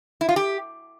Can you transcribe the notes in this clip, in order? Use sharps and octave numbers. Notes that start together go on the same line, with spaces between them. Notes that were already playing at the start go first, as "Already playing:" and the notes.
E4
F4
G4